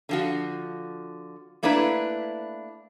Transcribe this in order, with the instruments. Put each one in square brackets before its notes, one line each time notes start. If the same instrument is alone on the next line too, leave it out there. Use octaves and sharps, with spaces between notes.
[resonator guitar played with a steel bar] D3 F3 F#4
A3 A#3 D4 E4 B4